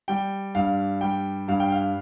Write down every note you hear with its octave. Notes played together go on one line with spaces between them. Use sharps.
G3 G5
G2 F5
G3 G5
G2 F5
G5
F5